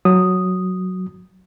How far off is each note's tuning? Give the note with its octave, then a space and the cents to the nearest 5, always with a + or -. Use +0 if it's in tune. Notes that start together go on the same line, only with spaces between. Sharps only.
F#3 -5 D#6 +0